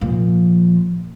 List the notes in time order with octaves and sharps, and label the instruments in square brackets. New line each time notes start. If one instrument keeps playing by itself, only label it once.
[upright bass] A#2 F3